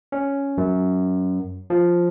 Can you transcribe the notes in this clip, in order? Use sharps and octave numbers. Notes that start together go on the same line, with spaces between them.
C#4
F#2
F3